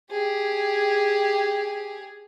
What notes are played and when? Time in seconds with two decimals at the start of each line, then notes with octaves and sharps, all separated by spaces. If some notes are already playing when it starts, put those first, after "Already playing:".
0.11 G4 G#4